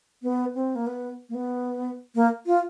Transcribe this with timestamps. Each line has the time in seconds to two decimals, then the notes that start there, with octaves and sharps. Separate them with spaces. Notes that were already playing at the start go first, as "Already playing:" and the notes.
0.23 B3
0.55 C4
0.75 A#3
0.87 B3
1.29 A#3
1.35 B3
2.15 A#3
2.46 F4